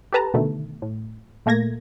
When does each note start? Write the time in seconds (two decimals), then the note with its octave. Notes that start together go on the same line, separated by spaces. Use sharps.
0.13 G4 A4 B4 A5 A#5
0.34 B2 D3 D#3 A3
0.82 A2
1.46 A#2 A3 A#3 G#6 A#6